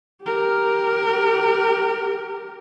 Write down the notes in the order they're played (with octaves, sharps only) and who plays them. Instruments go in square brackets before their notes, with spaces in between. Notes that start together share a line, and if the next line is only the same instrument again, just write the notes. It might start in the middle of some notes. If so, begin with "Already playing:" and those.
[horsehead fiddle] G4 A#4